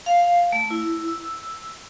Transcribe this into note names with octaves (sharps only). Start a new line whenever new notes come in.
F5
A3
E4
E6